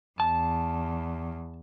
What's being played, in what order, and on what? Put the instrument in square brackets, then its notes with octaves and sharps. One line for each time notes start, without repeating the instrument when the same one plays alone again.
[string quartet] E2 [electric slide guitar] A5